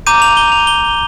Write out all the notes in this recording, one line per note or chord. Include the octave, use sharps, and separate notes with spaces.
A#5 D6 G6 D#7
F7
G7
F7
G7